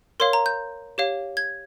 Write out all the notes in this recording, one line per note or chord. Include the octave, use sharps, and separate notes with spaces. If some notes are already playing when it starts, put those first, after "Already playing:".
A#4 C#5 F5 C6
A#5
G6
G4 C#5 F5
G#6